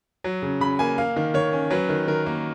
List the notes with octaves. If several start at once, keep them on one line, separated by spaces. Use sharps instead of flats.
F#3
C#3
C#3 B5
A#3 G#5
A#3 F5
D#3
D#3 C#5
C#4
F#3 B4
D#3
D#3 A#4
A#3